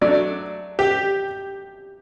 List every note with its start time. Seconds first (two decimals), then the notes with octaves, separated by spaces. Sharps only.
0.01 F#3 A3 D4 D5
0.79 G4